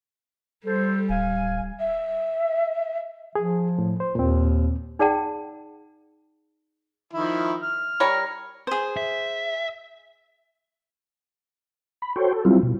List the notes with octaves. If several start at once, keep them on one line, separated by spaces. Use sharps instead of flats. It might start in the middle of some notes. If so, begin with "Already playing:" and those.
G3 A4 C5
D1 F5 G#5
E5
F3 G#4
A2
C5
D#2 A#2 C4
D#4 G#4 D5 F#5 G5 A5
D#3 F3 E4
F6
G3 A#4 C#5
G#4 C5
E5
B5
F#4 A4 C5 C#5 G5
A4
F#3 G3 C4 E4 F4
B2